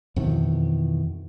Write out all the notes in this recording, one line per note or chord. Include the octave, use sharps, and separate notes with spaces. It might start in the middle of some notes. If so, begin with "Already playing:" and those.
F2 B2 D#3 E3